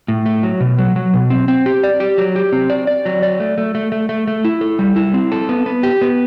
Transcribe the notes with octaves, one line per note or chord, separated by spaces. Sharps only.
A2
A3
F#3
B2
F#3
F#3
B2
C4
C4
G4
D5
G4
F#3
G4
C4
D5
D5
F#3
D5
A3
A3
A3
A3
A3
A3
E4
A4
G3
E4
C4
A4
B3
B3
G4
B3